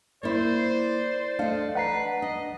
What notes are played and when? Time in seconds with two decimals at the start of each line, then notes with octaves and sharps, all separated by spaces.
0.23 A#3 E4 C5 D5
1.39 A3 D4 D#5 F5
1.75 B4 F#5 A#5 C7
2.22 D4 D#5